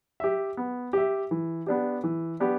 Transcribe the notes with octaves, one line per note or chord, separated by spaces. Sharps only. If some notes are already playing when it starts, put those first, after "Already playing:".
G4 E5
B3
G4 E5
E3
B3 D4 G4
E3
B3 D4 G4